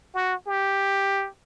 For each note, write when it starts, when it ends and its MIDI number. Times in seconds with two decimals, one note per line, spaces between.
0.15 0.35 66
0.47 1.28 67